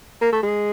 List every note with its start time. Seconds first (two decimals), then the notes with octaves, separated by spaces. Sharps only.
0.21 A#3
0.32 A3
0.43 G#3